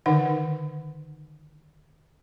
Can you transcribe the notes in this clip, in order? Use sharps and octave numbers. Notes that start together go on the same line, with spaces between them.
D3 D#3 D#4 F#5